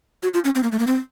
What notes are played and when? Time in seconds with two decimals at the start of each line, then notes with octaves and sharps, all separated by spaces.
0.23 F#4
0.34 F4
0.44 C#4
0.55 C4
0.63 A#3
0.72 A3
0.79 A#3
0.87 C4